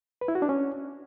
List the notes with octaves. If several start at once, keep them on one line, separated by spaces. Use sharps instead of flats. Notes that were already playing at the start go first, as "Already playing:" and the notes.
B4
E4
F#4
D4
C#4